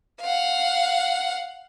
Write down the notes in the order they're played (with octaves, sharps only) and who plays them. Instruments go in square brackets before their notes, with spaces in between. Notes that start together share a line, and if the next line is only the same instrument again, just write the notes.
[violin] F5 F#5